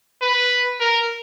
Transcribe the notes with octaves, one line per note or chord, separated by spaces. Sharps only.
B4
A#4